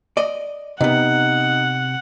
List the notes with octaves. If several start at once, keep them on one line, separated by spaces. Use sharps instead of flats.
D5 D#5
C3 B3 D#4 F#5